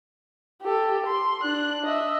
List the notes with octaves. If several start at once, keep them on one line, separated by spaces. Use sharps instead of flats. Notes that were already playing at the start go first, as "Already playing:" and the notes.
G4 A4
C6
D4 F#6
D#5 E5